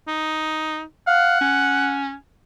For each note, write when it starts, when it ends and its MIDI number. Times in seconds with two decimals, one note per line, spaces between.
0.08 0.83 63
1.07 1.40 77
1.07 2.02 78
1.41 2.14 61